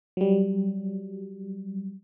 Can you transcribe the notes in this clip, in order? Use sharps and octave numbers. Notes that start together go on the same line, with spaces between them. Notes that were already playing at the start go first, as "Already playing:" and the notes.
F#3 G3